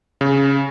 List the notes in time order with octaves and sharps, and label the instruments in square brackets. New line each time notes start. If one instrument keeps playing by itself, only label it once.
[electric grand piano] C#3